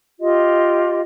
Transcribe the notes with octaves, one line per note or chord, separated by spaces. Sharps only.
F4 G4 D#5